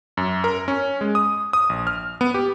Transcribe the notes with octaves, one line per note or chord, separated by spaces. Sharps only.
F#2
A#4
C#4
G#3
D#6
D#6
A#1
F6
B3
G4